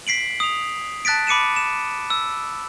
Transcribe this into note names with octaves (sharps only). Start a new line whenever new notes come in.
B6 C7 D7 F#7
D#6 F7
A5 F#6 A6 B6 D7
B5 D6 C#7 D#7 E7
E7
E6